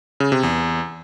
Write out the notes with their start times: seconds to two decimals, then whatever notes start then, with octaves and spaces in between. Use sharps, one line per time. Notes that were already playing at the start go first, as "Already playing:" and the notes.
0.20 C#3
0.32 C3
0.43 E2